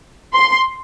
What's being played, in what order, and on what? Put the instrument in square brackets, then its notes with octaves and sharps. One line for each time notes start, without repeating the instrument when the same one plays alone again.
[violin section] C6